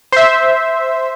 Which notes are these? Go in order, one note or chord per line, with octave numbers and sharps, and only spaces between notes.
C5 E5